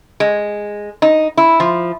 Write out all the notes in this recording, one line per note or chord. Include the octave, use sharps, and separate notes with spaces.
G#3
D#4
E4
F3